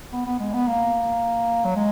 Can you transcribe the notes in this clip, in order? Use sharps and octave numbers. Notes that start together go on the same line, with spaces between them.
B3
B3
G#3
B3
A#3
F#3
G#3